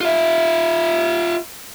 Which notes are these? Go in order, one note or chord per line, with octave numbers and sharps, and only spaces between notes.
F4 E5